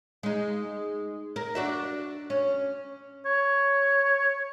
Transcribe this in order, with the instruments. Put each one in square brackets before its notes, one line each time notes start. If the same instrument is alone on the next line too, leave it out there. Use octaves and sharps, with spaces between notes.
[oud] G#3 D#4
A#4
D4 F#4 E5
C#4
[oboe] C#5